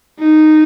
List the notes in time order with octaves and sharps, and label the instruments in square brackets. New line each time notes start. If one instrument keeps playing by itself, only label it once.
[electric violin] D#4